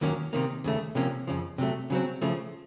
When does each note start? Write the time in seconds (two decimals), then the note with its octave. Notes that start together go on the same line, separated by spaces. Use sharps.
0.01 D#2 D#3 F#3 A#3 C#4
0.33 C3 D#3 A#3
0.64 D#2 C#3 A3
0.95 C3 F3 A#3 C#4
1.27 F2 C#3 F3
1.58 C3 F#3 A3
1.90 C#3 F#3 C4
2.22 C#3 F3 A3